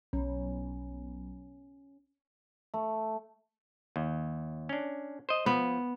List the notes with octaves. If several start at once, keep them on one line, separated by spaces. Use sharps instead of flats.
B1 C#4
A3
D#2
C#4 D4
C5 D#5
F3 B3